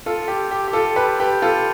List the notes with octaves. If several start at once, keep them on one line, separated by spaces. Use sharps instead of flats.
F4 A4
G4
G4
G4
F4 A4
G4 B4
G4 B4
F4 A4